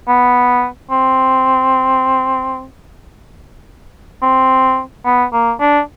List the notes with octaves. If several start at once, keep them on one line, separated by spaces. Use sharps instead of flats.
B3
C4
C4
B3
A#3
D4